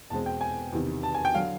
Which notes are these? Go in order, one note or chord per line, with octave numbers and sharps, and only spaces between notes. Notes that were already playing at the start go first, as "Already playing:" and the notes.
E2 B2 G#3 C4 A5
G5
G#5
E2 C3 D#3
A5
G#5
G5
D3 F#3 F5